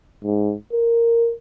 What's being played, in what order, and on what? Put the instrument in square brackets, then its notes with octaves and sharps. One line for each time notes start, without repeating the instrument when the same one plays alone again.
[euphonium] G#2
A#4